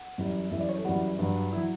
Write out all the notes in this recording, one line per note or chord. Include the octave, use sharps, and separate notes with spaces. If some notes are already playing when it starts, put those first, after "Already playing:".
Already playing: F#5
F#2 E3 G3
F#2 E3 G3 E5
D5
C#5
A4
F#2 E3 G3 F#4
G2 F#3 D4
E4
F#3